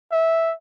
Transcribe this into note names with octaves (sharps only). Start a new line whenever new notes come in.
E5